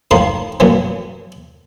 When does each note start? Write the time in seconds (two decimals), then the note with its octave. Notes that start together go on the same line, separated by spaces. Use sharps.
0.11 A2 D#3 F3 D#4 C6
0.60 A1 F#2 A#2 E3